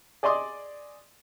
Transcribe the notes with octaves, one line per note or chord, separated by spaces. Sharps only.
G#4 D5 D#5 C6 D6 D#6